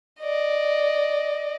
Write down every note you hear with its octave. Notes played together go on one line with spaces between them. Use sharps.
D5 D#5